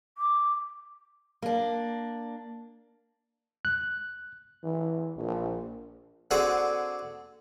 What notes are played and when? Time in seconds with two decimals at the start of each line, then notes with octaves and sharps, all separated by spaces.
0.18 D6
1.42 A#3 D4
3.65 F#6
4.64 E3
5.17 A#1
6.31 D3 C4 F#4 G#4 D5 D#6